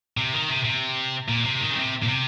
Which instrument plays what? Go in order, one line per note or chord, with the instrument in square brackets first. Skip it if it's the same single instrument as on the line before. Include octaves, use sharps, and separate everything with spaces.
[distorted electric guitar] C3
D#3
C3
C3
A#2
C3
D#3
C#3
C3
A#2
C3